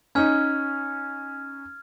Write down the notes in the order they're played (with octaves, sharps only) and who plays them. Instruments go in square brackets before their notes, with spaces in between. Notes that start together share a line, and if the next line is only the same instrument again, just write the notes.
[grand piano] C#4 D#4 [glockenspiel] F6 G#6